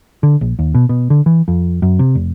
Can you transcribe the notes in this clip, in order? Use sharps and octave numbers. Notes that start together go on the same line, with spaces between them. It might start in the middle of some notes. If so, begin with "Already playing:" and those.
D3
A#1
D#2
B2
B2
D3
E3
F2
F#2
C3
F1